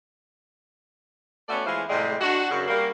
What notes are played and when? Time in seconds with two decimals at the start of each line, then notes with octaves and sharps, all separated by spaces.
1.49 A3 B3 C#4 F#4 A4 D5
1.66 E3 G#3 E4 F4 C5
1.89 A2 C3 F3 G3 G#3
2.21 D4 F#4
2.51 F#2 C#3
2.68 G3 A#3